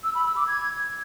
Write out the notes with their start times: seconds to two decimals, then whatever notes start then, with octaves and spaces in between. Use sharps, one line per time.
0.04 E6
0.15 B5
0.26 E6
0.37 D6
0.47 G#6